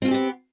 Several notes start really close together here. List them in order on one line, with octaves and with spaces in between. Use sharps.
C4 F4 G#4 G4 B3